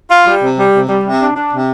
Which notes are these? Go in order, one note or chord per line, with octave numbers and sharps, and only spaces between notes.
F4
G3
C3
G3
C3
G3
C3
D4
D4
C3